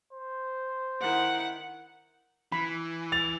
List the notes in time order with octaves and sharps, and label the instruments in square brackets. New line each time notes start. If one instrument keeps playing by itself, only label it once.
[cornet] C5
[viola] D#3 E4 [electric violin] F#5
[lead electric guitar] E3 [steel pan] B5
[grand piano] A6 F7